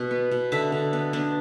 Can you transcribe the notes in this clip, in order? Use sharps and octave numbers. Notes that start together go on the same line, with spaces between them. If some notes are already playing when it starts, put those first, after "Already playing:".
Already playing: B2
B3
B2
D3 E5
D3
B3
B3 D4